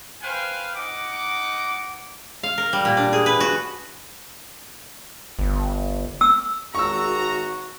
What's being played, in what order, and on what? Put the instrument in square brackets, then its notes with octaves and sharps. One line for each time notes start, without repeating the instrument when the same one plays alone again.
[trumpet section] B4 C5 F5 G5 G#5
D#4 F#5 D6
[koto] F5
A#4
G3
A#2
D4
G#4
B4
F#4
[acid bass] G1
[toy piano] E6
[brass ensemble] G#1 A#5 [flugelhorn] F#4 [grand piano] C#6 E6